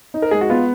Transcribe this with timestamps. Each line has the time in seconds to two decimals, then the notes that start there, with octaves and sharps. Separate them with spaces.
0.14 D#4
0.22 A#4
0.31 G#3 G#4
0.41 F#4
0.50 B3 F4